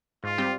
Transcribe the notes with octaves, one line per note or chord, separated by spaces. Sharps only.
G#2 F4
G3 C4 G4